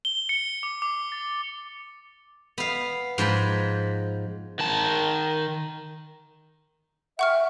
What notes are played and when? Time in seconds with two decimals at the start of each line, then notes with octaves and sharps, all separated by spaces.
0.05 G7
0.29 C#7
0.63 D6
0.82 D6
1.12 A6
2.58 B3 F5
3.18 G#2 F3 B4 B5
4.59 D#3 A5
7.19 E5 F#5 G5 C#6 F6